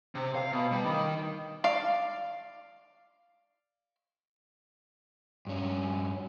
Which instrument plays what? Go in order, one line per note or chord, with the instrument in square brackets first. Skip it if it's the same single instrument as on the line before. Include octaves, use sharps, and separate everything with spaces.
[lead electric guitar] C3
F5
B2
G3
D#3
[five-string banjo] D5 F5
[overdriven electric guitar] G2 C#4